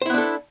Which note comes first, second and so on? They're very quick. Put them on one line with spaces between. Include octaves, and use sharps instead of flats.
C5 E4 B3 D4 A4